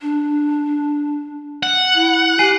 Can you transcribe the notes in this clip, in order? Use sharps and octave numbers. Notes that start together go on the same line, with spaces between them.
D4
F#5
E4
G4 G#5 C7 D#7